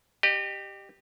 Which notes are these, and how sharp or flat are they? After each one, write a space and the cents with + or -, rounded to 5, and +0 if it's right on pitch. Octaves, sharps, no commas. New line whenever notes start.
G4 +0 D#5 -40